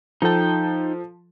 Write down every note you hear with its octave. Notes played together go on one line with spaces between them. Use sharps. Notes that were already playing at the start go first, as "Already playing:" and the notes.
F3 D#4 A4 G5 A5